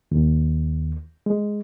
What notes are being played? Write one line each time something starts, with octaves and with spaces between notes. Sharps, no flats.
D#2
G#3